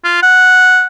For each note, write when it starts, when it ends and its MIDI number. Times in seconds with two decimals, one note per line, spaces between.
0.04 0.22 65
0.23 0.86 78